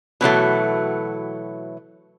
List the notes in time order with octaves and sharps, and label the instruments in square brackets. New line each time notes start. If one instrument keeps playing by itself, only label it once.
[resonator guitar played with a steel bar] B2 E3 F#3 A3